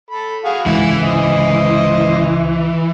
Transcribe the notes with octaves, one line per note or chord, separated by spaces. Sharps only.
A4 B5
F#4 G#4 F5
C#2 G#2 D3 E3 E4
C5 D#5